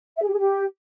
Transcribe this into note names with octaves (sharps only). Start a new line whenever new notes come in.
E5
G#4
G4
G#4
G4